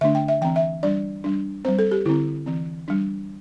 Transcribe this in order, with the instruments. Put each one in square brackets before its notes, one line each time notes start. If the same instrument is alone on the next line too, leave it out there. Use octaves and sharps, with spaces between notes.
[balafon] D3 A3 D4 E5
G5
E5
E3 C4 G5
E5
G3 D4 D5
G3 D4
C4 C5
G3
A4
G4
D3 C4 E4
E3 C4
G3 D4